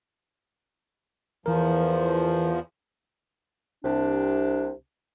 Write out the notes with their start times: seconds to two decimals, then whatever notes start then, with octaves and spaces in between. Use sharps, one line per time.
1.46 E2 E3 F3 A#4
3.83 C2 C3 D4